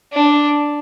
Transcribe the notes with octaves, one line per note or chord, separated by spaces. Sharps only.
D4